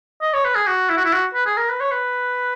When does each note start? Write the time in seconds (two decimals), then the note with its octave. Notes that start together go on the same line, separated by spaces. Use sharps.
0.21 D#5
0.34 C#5
0.45 B4
0.55 G#4
0.67 F#4
0.89 E4
0.97 F#4
1.05 E4
1.13 F#4
1.34 B4
1.46 G#4
1.57 A#4
1.69 B4
1.80 C#5
1.91 B4